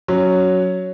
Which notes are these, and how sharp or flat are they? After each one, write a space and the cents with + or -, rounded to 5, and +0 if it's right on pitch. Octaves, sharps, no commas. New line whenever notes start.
F#3 +0 C#4 +5